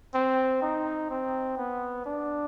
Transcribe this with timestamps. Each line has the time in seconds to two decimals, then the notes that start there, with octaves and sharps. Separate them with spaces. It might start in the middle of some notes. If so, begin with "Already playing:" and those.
0.14 C4
0.62 D#4
1.11 C4
1.58 B3
2.06 D4